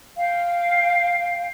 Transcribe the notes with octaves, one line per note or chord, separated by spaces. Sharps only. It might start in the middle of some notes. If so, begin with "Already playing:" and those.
F5 G5